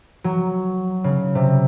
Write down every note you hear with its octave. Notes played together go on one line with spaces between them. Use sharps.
F#3
C#3
C3